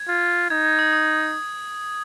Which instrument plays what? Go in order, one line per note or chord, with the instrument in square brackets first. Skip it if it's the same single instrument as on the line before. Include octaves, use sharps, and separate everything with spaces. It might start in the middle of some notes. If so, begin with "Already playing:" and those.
Already playing: [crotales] G#6
[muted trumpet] F4
[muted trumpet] D#4 [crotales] G#6
[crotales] G#6
D#6
D#6